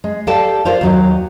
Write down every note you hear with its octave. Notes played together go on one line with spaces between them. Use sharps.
G#3
G4 A4 D5 F5 G5 A5
F4 A#4 C5 D5 F5
D#2 F#3 D#4